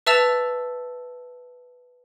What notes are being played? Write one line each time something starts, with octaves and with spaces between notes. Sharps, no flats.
B4 E5 A5 E6 A6 F7